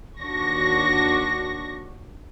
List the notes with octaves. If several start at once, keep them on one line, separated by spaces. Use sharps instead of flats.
D#2 D4 F#4 C#6 A#6